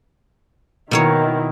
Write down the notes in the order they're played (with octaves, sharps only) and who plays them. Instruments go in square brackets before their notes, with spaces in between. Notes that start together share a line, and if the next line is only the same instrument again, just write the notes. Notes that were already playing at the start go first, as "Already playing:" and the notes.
[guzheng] B2 A#3 C#5 [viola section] D#3 E4